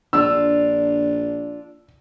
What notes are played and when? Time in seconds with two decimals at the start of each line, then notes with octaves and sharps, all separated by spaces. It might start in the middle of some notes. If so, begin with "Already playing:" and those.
0.13 A#1 D4 F4 E6